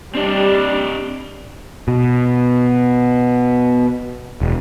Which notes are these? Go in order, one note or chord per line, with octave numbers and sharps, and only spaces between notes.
G3 C4 D4 D5 D#5
B2
E1